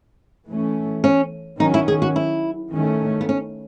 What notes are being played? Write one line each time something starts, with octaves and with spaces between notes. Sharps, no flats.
E3 A3 C#4
C#4
D#3 F#3 C#4 D#4
E4
G#4
F#4
E4
D#3 A3 C#4
B3
C#4